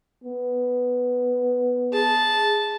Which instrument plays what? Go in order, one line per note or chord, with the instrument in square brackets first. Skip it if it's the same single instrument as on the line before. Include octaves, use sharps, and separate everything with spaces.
[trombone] B3
[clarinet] G#4 [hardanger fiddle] A5